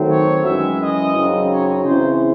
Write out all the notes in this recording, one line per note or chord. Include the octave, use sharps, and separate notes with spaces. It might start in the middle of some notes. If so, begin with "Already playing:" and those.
Already playing: D#3 F#3 A3 C4
C#5
F#2 E3 G#3 E5
D#5
F#2 C#3 F#3 C4 D#4
C#5
C#3 E3 C4 E4 C5